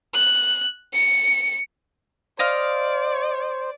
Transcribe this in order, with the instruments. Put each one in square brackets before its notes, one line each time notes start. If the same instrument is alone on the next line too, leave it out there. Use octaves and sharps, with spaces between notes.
[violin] F#6
C#7
[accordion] C5 [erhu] D5 [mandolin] D#5 F5 F6